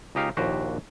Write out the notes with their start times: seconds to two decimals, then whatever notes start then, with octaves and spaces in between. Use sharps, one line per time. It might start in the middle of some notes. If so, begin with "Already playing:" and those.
0.15 C#2 D#4 G4 F5
0.37 A#1 D#2 F#4 G4 C5